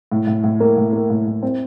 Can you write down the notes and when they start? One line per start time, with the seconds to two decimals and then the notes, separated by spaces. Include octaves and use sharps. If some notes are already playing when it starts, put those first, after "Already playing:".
0.12 A2
0.27 A2
0.44 A2
0.60 A#3
0.77 A2
0.93 A#3
1.10 A2
1.26 A2
1.43 C4